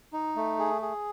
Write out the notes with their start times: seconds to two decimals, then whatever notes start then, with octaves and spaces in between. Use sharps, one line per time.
0.13 D#4
0.36 A3
0.59 G#4
0.82 G#4